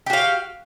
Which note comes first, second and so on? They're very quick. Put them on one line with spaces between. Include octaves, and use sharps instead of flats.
G4 F#4 F5